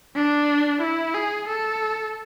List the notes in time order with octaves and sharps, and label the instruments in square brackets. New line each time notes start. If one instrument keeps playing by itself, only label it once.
[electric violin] D4
E4
G#4
A4